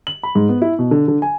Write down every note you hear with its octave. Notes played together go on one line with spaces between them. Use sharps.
F#7
B5
G#2
B3
E4
B2
D3
D3
G#5